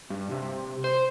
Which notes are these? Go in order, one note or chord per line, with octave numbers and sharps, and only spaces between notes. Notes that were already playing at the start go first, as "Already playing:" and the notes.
G2
C3
C5